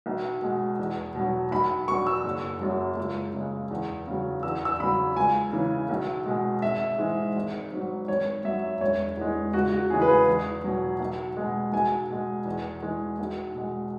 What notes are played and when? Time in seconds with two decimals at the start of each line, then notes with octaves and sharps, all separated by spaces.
0.06 B1
0.42 B2 G#3
0.79 E2
1.15 B2 F#3
1.51 B1 B5
1.88 B2 F#3 C#6
2.07 E6
2.24 F#1
2.60 F#2 F#3
2.97 C#2
3.33 C#3 G#3
3.71 E2
4.07 C#3 F#3
4.43 E2 E6
4.65 E6
4.80 C#3 F#3 B5
5.16 C#2 G#5
5.53 C#3 E3
5.89 B1
6.26 B2 G#3
6.62 G#1 E5
6.98 G#2 E3 G#3
7.36 G#1
7.72 G#2 F#3
8.08 G#1 C#5
8.45 F#2 F#3 E5
8.81 E1 C#5
9.17 E2 E3 G#3
9.54 C#2 F#4
9.72 F#4
9.90 C#3 E3 G#3 G#4
10.02 B4
10.08 G#4
10.28 E2
10.64 B2 F#3
11.00 B1
11.37 B2 G#3
11.72 B1 G#5
12.10 B2 G#3
12.45 E2
12.83 E3 G#3
13.19 B1
13.55 B2 G#3